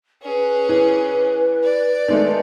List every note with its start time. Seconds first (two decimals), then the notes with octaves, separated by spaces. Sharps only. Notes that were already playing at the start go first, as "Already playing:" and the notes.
0.22 C#4 G#4 B4
0.69 E3
1.63 D5
2.08 D#3 G#3 A3